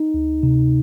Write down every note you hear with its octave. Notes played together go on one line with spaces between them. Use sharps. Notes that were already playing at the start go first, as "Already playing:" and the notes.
Already playing: D#4
D2
C3